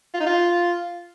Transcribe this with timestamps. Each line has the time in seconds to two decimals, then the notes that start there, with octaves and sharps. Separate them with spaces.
0.14 F4
0.20 D#4
0.26 F4